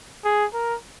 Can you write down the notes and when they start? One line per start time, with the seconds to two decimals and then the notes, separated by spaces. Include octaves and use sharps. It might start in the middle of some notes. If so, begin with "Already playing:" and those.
0.24 G#4
0.54 A#4